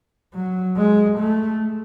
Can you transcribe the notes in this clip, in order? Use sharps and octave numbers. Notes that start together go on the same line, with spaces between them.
F#3
G#3
A3